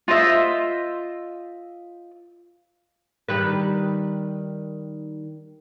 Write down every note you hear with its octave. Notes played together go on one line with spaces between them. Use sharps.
F4 C5 D#5 E5
D#3 G3 B4